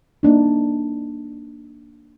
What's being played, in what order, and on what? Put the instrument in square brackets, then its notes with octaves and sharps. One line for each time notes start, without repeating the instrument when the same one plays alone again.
[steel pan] A#3 D4 D#4